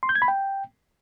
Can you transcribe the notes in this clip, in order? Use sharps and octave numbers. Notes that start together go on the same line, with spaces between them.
C6
G6
G#6
B5
G5